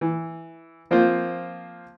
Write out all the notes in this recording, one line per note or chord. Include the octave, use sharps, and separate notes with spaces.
E3
F3 A#3 C4 F4 C5